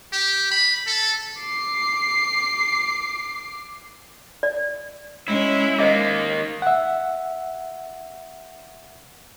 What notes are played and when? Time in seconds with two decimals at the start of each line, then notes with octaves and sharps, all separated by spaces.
0.13 G4
0.51 B5
0.87 A4
1.41 D6 C7
4.43 D5
5.28 G#3 C#4 E4
5.79 D#3 G#3 A#3 C5 D#5 D6
6.62 E5 F#5